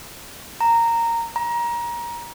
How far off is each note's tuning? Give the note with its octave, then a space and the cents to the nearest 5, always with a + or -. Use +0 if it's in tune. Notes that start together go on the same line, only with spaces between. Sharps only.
A#5 -10
A#5 +25